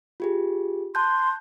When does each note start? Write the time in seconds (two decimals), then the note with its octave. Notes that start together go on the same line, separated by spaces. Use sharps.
0.20 F4 G4 G#4
0.95 A5 C6 F#6 G6